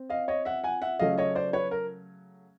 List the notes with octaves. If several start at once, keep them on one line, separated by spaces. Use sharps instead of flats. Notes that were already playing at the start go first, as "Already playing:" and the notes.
Already playing: C4
D#5 F5
C#5 D#5
E5 F#5
F#5 G#5
E5 F#5
C#3 F#3 A3 C#4 D#5 F5
C#5 D#5
C5 D5
B4 C#5
A#4